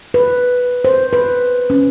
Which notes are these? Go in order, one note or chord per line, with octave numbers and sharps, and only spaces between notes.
B4
C5
B4
C#4